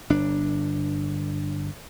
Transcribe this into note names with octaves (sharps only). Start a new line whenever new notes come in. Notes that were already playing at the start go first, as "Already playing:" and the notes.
G1 D4